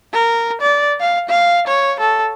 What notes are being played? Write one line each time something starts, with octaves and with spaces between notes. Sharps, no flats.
A#4
D5
F5
F5
C#5
A4